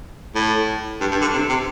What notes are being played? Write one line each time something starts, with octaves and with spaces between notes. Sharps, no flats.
A2
G2
G2
D3
C3
C3